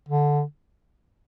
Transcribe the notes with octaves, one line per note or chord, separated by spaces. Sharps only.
D3